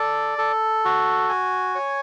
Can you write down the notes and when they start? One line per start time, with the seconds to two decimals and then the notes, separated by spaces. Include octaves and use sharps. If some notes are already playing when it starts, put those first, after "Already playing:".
Already playing: A4 D5
0.38 A4
0.85 F#4
1.29 G#5
1.75 C#5